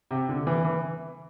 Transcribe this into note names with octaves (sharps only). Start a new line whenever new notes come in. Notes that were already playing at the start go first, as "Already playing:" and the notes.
C3
D3
E3
E3